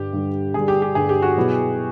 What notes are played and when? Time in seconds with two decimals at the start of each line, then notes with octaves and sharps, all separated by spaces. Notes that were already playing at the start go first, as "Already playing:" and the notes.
Already playing: G2 D3 G3 G4
0.13 G2 D3 G3
0.54 G2 D3 G3 G#4
0.68 G4
0.82 G4
0.95 G2 D3 G3 G#4
1.09 G4
1.22 F#4
1.36 B2 F#3 B3 E4